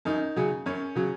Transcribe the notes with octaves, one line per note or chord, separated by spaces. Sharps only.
F#2 D#4
C#3 F#3
F#2 C#4
C#3 F#3